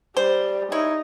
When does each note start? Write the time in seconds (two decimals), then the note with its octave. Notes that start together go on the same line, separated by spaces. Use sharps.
0.17 G3 C5
0.72 D#4 E4 C#5